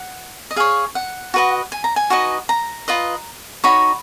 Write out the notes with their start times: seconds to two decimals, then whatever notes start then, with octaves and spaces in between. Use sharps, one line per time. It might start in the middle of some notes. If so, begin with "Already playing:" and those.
Already playing: F#5
0.51 D#5
0.56 G#4 C#5 F5
0.95 F#5
1.34 F#4 B4 D#5
1.72 G#5
1.84 A#5
1.96 G#5
2.10 D#4 F#4 B4 D#5
2.49 A#5
2.88 F4 B4 D#5
3.64 D#4 F#4 C#5 B5